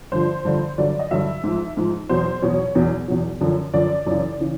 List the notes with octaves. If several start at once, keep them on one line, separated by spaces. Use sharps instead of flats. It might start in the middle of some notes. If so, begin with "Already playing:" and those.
G2 D3 F3 C5
G2 D3 F3
G2 D3 F#3 D5
D#5
G2 D3 F#3 E5
G#2 F3
G#2 F3
E2 B2 F#3 C5
E2 B2 F#3 C#5
E2 B2 F#3
E2 B2 F#3
F#2 D3 F3
F#2 D3 F3 D5
F#2 C#3 E3
C#3 E3